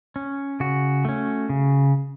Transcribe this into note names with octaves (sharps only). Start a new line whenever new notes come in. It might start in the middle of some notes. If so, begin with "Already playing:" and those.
C#4
C#3 F#4
A3 C#4
C#3